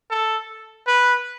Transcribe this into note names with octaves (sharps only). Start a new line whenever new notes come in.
A4
B4